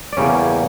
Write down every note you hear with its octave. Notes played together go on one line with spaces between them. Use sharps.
D5
E2 C#3 G3 A#3 C#4 C#5